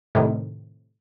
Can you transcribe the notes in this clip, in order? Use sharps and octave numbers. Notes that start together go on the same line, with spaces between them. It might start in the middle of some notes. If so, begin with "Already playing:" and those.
A2 C3 D#3